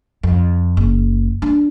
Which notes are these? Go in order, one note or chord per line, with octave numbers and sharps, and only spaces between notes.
F2
F#1
D4